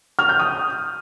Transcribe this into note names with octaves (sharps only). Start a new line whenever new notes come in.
F6
G6
D#6